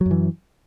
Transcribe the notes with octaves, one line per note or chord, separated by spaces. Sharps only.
F#2 E3 F#3